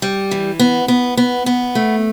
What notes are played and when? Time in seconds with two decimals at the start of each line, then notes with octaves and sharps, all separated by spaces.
0.02 G3
0.31 E3
0.59 B3
0.88 B3
1.17 B3
1.46 B3
1.75 A3